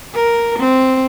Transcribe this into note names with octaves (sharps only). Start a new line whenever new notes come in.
A#4
C4